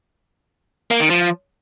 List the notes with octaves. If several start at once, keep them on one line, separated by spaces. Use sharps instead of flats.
A#3
D#3
F3